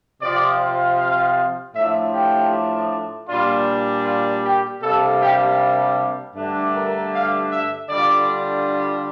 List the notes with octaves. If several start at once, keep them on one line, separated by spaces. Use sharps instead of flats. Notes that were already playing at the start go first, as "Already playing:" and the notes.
C3 F3 C4 F4 D5
F5
A2 F3 A3 D4 F4 E5
G4
A#2 G3 D4 F4
F4
G4
C3 G3 A#3 D4 A4
G4
G2 D3 A3 D4
A#4
F5
E5
D3 G3 D4 F4 D5